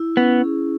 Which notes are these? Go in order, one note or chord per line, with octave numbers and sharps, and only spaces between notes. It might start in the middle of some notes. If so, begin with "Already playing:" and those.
Already playing: E4
B3 C#4
G#4